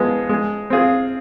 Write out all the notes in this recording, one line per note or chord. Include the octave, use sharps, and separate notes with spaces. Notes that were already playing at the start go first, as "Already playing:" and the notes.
Already playing: F3 G#3 B3 F4
G#3
C4 F4 G#4